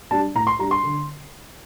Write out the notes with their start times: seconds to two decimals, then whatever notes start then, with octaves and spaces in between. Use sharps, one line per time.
0.11 G3 D4 A5
0.35 A2 A#5
0.47 C6
0.59 G3 D4 A#5
0.71 C6
0.83 D3